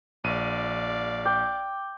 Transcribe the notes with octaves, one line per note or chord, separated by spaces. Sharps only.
A#1 D5 F5 D#7
G5 D6